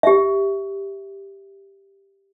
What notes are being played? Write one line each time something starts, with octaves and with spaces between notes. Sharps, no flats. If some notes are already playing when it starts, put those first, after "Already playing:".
G4 E5